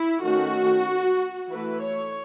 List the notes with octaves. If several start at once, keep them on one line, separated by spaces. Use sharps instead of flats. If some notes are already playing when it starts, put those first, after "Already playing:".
Already playing: E4
D#3 A3 C#4 F#4
E3 A3 E4 B4
C#5